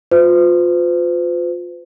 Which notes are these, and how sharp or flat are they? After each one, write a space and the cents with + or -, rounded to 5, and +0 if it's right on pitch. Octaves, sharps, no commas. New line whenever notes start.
F4 +25 C5 -45